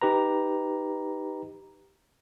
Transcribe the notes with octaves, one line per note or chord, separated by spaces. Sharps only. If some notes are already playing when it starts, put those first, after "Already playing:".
D#4 G4 B4 A#5